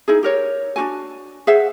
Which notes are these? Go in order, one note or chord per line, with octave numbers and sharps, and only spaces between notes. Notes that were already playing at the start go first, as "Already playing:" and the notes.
D#4 E4 G#4
G4 A#4 C#5
D4 D#4 F#4 G#5
G#4 C5 E5 F#5